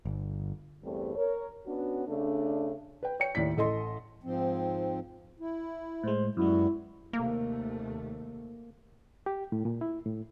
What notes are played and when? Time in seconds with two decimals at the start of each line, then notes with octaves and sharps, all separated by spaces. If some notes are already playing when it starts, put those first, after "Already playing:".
0.05 G1
0.84 E2 G2 G3 A3 C4
1.15 A#4 C#5
1.66 B3 C#4 D4 F#4
2.06 C#3 A3 D4
3.03 B4 G5
3.20 C#5 G5 C#7
3.35 D#2 A2 D5 B6
3.57 A1 A4 D#5 C6
4.23 G#2 F3 C4
5.40 E4
6.04 A2 G#3 C5
6.37 F#2 G3 G#3 B3 E4 F#4
7.13 D#2 C3 A3 A#3
9.26 G4
9.52 A2
9.65 A#2
9.81 E4
10.06 A2